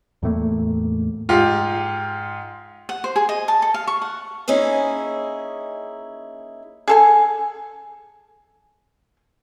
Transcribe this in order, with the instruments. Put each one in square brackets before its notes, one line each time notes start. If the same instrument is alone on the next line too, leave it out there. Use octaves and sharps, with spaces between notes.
[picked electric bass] E2 A2 A3 A#3
[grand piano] G#2 F4 G4
[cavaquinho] F#5
C5
G#4
D#5
A5
A4
F5
C#6
F#5
[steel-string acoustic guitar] A#3 C#4 D#4 E4 G#4
[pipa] G#4 A4 G#5